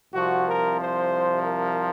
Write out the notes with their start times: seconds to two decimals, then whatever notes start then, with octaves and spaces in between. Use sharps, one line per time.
0.13 C2 C3 F3 F#4
0.46 A#4
0.79 C5
1.43 A#4